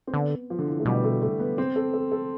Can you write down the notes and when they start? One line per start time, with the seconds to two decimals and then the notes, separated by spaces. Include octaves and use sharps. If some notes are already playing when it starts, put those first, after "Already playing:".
0.07 C4
0.14 D3 B3
0.50 F3
0.59 D3
0.67 E3
0.80 A3
0.85 B2 G3
1.04 A3
1.22 A3
1.39 B3
1.58 C4
1.76 A4
1.94 A4
2.12 A4